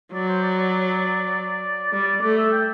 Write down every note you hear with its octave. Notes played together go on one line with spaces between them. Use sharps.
F#3 D5
C5
D5
D5
G3 D5
D5
A3 D5
E5
G5